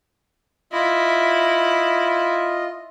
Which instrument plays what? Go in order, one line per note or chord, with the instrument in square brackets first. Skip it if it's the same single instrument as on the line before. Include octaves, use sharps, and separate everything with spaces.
[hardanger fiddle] E4 [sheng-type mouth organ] F4 D#5